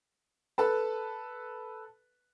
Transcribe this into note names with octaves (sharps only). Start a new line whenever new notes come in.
A4 B4 A5